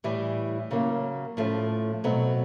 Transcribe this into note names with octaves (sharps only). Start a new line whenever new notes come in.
A2 E3 G3
C#3 F#3 A#3
A2 F3 A3 C#4
B2 F#3 A3 C4